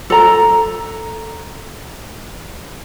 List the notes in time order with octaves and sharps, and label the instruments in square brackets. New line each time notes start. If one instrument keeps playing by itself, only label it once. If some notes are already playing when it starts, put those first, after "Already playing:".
[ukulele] A4 A#5